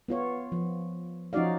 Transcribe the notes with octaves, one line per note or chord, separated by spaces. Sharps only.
B3 F4 C#5
F3
F3 C#4 D#4 F#4 D5 F5